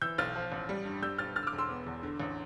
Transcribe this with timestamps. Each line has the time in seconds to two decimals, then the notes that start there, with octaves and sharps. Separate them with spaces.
0.02 E3 E6 G6
0.18 B1 F6 A6
0.36 F3
0.52 A1
0.69 G3
0.85 G2
1.02 G3 E6 G6
1.18 B1 F6 A6
1.35 D3 F6 A6
1.43 E6
1.47 D6 F6
1.53 E1
1.58 C6 E6
1.70 B3
1.86 E2
2.03 D3
2.20 A1